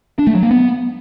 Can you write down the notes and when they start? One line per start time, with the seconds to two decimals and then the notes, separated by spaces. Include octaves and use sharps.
0.19 D4
0.27 A3
0.35 F#3
0.43 A#3
0.51 B3